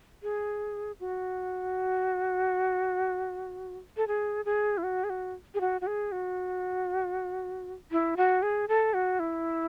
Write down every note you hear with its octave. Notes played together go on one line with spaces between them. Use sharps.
G#4
F#4
A4
G#4
G#4
E4
F#4
G#4
F#4
G#4
F#4
F#4
G#4
F#4
E4
F#4
G#4
A4
F#4
E4